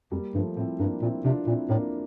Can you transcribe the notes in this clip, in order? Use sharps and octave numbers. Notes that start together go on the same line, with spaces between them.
F2 G3 A#3
G2 F3 A3
A2 C4 E4
G2 A#3 D4
A#2 C4 E4
C3 D4 F4
A#2 C4 E4
A2 A#3 D4